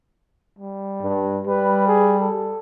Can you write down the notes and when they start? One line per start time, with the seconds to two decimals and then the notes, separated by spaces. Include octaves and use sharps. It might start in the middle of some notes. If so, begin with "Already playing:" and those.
0.59 G3
1.03 G2
1.47 G3 B4
1.88 G#4
2.20 A4